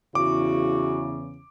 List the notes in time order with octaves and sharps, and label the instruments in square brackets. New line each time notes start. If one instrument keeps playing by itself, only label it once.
[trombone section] E2 C#3 [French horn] E4 [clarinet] F#4 [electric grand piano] D6